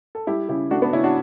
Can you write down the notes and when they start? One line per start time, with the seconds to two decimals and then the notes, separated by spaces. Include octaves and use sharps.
0.15 A4
0.27 G3 E4 G4
0.49 C#3 E4 G4
0.71 A3 D4 F#4
0.82 B3 D4
0.93 C#3 C#4 E4
1.04 D4 F#4